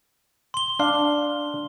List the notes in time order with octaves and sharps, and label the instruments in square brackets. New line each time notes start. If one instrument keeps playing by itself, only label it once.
[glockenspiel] C6 G7
[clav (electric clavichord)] D4 F5 [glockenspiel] C6